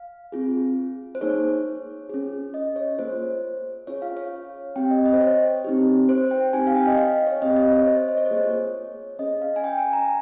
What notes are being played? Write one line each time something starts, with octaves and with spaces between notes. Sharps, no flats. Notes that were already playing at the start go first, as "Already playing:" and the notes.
Already playing: F5
C4 F4 G#4
C5
A#3 D#4 G#4 C#5
C#4 F4 G#4
D#5
C#5
A#3 F4 G#4 C5
C#4 F4 G#4 C#5
F5
C#5
C4 G4 G5
D#5
D#5
C5
C#5
C4 D#4 G4
C5
G5
C4 D#4 G4 G#5
F5
G5
D#5
F5
C#5
C4 G4 D#5
D#5
C#5
C5
D#5
C#5
C5
A#3 F4 G#4 C#5
C#4 G#4 D#5
F5
G#5
G5
G#5
A#5